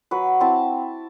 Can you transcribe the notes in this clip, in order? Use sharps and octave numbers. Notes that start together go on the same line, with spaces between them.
F#3 B4
C4 E4 A5